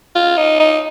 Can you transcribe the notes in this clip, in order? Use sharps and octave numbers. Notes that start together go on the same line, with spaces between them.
F4
D#4
D#4